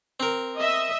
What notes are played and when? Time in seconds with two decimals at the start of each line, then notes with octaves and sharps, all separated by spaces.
0.20 C4 A#4
0.57 D#5 E5